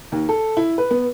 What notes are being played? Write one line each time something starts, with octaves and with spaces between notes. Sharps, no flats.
D#2
A4
E4
B4
B3